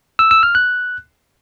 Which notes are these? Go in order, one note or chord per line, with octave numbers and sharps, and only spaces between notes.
E6
E6
F6
F#6